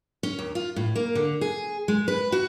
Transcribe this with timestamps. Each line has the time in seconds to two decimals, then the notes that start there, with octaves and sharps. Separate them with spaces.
0.23 C#4
0.39 D#2
0.55 F4
0.76 A2
0.96 A#3
1.15 D3
1.41 G#4
1.88 G#3
2.08 B4
2.32 F#4